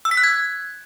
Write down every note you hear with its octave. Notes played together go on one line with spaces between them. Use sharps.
E6
B6
F#6
G#6